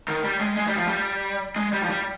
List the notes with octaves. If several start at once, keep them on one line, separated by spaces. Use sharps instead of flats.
D#3
G3
G#3
G#3
G3
F3
G3
G#3
G3
F3
G3